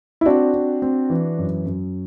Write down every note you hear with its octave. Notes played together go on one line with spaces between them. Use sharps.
E4
C4 D4 F#4
C4
C4
E3
F#2
F#2